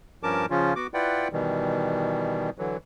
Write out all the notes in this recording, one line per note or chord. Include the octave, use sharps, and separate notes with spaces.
G2 F3 C#4 A#4 A5 D6
C#3 F3 C#4 F4
B3 F#4 D6
E4 F4 B4 D5 F#5 G5
B2 D#3 E3 G3
D3 E3 F#3